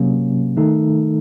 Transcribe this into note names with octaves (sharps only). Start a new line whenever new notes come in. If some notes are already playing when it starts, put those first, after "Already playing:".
Already playing: C3 F#3 A#3 C#4
D#3 A3 D#4 A4